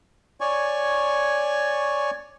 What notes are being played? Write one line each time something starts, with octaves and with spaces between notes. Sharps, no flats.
C#5 D5 G#5 C#6